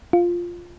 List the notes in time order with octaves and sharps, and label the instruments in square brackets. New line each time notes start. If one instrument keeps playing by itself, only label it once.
[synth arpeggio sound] F4